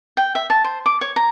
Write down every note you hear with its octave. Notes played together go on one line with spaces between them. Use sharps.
G5
E5
A5
C5
D6
C#5
A#5